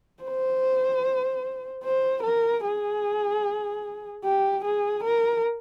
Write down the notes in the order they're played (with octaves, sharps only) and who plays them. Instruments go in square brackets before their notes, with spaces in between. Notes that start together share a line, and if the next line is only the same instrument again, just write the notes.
[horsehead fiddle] C5
C5
A#4
G#4
G4
G#4
A#4